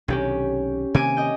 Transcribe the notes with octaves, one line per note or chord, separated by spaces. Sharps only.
B1 C3 D#3 C#4 G4
C3 D#3 A#3 G#5 D6 D#7
D#5 G5